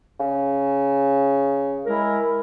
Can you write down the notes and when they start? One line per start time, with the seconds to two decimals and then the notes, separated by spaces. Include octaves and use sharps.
0.19 C#3
1.86 G#3 E4 A#4